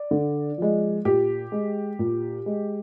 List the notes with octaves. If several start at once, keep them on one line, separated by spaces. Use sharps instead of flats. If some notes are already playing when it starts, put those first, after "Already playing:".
Already playing: D5
D3
F3 G#3
A#2 G4
G#3
A#2
G#3